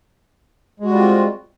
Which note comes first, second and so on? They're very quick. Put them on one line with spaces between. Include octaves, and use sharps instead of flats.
G#3 F#4 G3 F4 C4